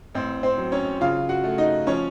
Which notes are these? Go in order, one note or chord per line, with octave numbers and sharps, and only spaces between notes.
A1 C4 C5
C4 C5
F#3
C#4 C#5
C#3 F4 F5
F#4 F#5
A3
D#4 D#5
F3 C#4 C#5